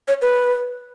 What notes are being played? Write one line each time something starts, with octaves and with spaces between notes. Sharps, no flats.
C#5
B4